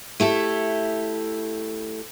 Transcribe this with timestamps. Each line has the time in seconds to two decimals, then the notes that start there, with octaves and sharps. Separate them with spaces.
0.20 A3 E4 G4 A4